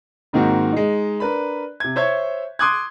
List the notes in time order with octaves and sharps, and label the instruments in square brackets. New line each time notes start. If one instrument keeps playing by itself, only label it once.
[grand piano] G#2 D#3 A#3 C4 F#4
G#3 D#4
D4 A#4 B4 B5
C3 G#6
C5 C#5 E5 C#6 G#6
C6 D6 D#6 F#6 G#6